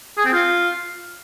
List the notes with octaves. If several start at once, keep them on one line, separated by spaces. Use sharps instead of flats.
G#4
C4
F4